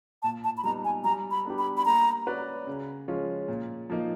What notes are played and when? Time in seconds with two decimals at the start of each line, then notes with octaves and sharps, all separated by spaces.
0.23 A#2 A5
0.44 A5
0.57 B5
0.63 G3 B3 D#4 A#5
0.85 G#5
1.04 G3 A#5
1.31 B5
1.45 B3 D4 G4
1.58 B5
1.77 B5
1.85 A#3 A#5
2.26 C#4 F#4 B4 D5
2.67 C#3
3.08 F3 G#3 C#4 F4
3.48 A#2
3.90 F3 A#3 D#4